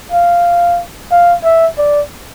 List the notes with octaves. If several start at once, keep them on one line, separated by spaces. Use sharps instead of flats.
F5
F5
E5
D5